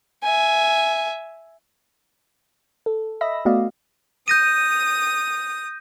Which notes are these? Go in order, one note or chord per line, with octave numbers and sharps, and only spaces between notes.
E5 G#5
A4
D#5 E5 B5 E6 A#6
A3 B3 F#4 D5 D#5 F5
D#6 G6 A#6 D#7